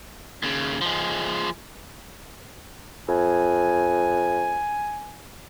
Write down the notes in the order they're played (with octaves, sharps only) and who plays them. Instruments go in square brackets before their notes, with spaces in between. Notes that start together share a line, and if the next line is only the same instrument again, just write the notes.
[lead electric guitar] D#2 C#3
F3 G#3
[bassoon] F2 [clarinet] G#5